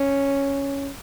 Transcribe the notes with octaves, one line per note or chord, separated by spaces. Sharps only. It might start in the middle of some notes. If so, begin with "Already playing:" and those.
Already playing: C#4